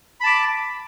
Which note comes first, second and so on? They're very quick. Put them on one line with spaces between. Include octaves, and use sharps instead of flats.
B5 A5 D6